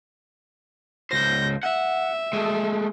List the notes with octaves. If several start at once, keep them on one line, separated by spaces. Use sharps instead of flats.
C#2 C5 G6 A#6
E5 F#5
G#3 A3